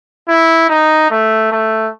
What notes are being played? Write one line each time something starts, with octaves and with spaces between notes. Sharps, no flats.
E4
D#4
A3
A3